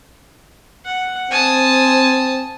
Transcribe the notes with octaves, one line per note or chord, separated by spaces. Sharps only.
F#5
C4 G#5 A5 D#6